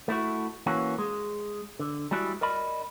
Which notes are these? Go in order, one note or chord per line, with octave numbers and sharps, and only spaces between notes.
A3 E4 F#4
E3 A#3 C#4 F#4
G#3
D3
G3 G#3 E4 F#4 D5
A#4 D5 D#5 B5